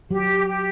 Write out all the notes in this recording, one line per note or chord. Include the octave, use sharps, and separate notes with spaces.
F#3 G4
G4